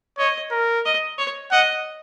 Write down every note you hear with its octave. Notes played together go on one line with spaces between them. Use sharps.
C#5 D#5
A#4
D#5
C#5
D#5 F#5